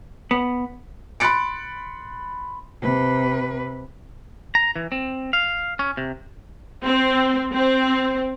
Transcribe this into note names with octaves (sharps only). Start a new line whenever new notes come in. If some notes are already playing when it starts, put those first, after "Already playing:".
B3
B5 C6 F#6 A6 C#7 D7
C3 B4
A#5
E3
C4
F5
C#4
C3
C4
C4